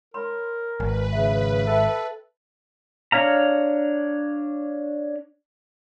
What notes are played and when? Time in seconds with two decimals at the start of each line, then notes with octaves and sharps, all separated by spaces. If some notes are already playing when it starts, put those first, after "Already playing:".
0.14 A#4 C#5 B5 C6
0.80 G#1 B4 G#5
1.13 C#3 E5
1.67 A4 E5 G5
3.12 D4 C#5 F5 A#5